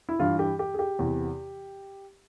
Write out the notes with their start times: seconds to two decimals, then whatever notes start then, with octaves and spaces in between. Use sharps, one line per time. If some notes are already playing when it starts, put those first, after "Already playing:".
0.09 E4
0.19 G2 E3 F4
0.39 G4
0.59 G4
0.74 G#4
0.79 G4
0.99 E2 C3 E3